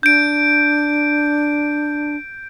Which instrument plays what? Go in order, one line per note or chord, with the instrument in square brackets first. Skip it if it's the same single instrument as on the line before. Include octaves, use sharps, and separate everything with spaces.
[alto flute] D4 [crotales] G6 D7